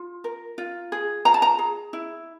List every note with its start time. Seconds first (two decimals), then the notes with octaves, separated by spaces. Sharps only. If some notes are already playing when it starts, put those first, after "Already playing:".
Already playing: F4
0.24 A#4
0.58 F4
0.92 G#4
1.25 F4 A#5
1.34 A5
1.42 A#5
1.59 G#4
1.93 E4